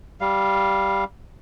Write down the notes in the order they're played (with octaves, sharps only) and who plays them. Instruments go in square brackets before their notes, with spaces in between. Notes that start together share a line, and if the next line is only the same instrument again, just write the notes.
[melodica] G3 F5